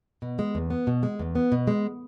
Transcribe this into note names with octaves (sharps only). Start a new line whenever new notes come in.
B2
G#3
E2
B3
B2
G#3
E2
B3
B2
G#3